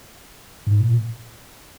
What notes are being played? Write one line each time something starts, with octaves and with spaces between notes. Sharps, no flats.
G#2
A#2